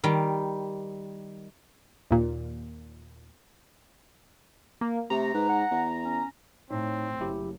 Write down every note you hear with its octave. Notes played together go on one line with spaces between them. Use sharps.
D#3 G3
D#2 A#2
A#3
C3 A3 A#5
G#2 B4
F#5
E2
C#4
A2 A3 C4 D#4 C#5
F#1 F#3 E4 G4